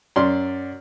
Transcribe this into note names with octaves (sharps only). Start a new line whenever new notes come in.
F#2 D5 C6